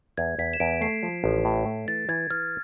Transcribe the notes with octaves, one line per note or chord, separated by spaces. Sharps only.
E2 G#6
E2 B6
E7
E2 D7
A3 C7
F3
A1
A2
A3
E3 A6
E3 G#6
E3 F6